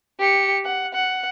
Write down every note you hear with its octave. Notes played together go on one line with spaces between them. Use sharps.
G4 C#7
F#5
F#5